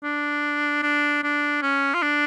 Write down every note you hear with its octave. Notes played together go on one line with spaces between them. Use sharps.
D4
D4
D4
C#4
F4
D4